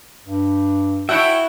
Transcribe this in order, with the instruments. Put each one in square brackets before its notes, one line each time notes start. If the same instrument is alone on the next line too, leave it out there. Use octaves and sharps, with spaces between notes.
[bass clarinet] G2
[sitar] E4 F#4 [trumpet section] A4 C#5 G5 [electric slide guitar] E5